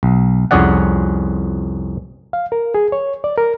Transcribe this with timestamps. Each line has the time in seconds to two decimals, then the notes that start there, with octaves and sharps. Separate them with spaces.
0.03 B1
0.51 C2 F2 C#4 G#4 D5 F#5
2.33 F5
2.52 A#4
2.74 G#4
2.92 C#5
3.24 D5
3.37 A#4